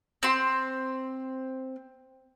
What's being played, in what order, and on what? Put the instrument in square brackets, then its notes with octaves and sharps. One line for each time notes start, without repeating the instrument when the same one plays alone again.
[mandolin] C4 C6